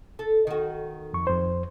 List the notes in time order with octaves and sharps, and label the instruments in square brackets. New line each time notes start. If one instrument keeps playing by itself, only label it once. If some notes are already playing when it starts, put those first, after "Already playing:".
[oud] A4
D#3 F#4
[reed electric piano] F2 C#6
F2 C5